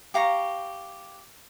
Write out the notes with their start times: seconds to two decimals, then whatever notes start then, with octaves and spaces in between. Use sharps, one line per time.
0.14 G4 F5 A#5 C#6